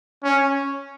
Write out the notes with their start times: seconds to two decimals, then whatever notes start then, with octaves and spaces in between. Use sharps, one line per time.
0.23 C#4